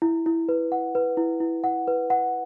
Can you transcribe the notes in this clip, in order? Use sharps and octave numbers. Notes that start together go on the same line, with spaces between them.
E4
E4
B4
F#5
B4
E4
E4
F#5
B4
F#5